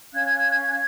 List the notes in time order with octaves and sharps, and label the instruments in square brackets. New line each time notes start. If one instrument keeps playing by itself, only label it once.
[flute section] C#4 F5 F#6 G#6